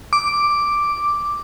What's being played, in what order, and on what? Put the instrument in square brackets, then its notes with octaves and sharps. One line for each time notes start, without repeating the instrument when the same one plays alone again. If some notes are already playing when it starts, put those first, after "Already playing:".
[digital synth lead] D6